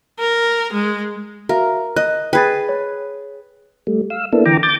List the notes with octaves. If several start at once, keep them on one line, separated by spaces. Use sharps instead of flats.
A#4
G#3
F#4 A#4 E5 F5
D#5 F#6
G#4 B4 G5 B5 A6
C#5
G3 A3
F5 E6
A#3 B3 D4 E4 A4
D3 E3 G5 A#5 D6
D6 G6 A6